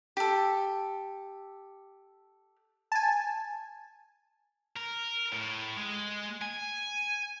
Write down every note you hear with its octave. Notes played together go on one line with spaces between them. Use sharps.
G4 A4
G#5 A5
A#4
A2
G#3
G#5